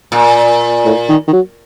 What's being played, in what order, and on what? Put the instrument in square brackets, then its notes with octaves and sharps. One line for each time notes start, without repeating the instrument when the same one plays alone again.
[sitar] A#2
[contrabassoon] A2
D#3
D#3
F#3